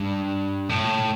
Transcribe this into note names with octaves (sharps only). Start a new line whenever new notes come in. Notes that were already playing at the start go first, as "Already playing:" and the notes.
Already playing: G2
A2